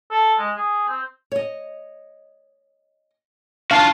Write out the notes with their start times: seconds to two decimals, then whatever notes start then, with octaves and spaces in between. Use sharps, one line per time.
0.11 A4
0.39 G#3
0.56 G#4
0.89 C4
1.32 C#5 D#5
3.71 D4 F4 F#4 F5 A5